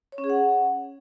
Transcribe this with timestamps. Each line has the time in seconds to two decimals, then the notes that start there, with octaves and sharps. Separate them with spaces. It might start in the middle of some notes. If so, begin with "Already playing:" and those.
0.12 C#5
0.18 C#4
0.24 G#4
0.30 F#5